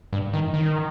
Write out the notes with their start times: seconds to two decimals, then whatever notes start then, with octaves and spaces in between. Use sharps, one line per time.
0.13 G2
0.33 D#3
0.54 D#3